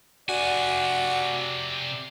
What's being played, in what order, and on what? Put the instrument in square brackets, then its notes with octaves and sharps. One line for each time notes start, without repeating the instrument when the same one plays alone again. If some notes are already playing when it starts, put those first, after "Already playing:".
[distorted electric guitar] C3 G#5 [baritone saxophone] F#4 [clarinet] D5